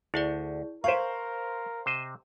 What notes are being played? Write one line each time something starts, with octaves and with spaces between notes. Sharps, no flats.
D2 E4 G#4 D5
A#4 C5 E5 F5 G5 G#5 C#6
C3 C5 D#5